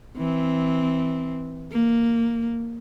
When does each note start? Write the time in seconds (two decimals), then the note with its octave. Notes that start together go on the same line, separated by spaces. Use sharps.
0.17 E3 C4
1.72 A#3